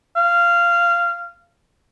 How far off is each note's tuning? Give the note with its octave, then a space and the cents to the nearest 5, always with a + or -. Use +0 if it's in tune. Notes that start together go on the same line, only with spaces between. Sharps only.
F5 -15